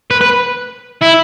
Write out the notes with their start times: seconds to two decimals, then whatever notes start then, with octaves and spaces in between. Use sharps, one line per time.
0.11 B4
0.21 B4
1.02 E4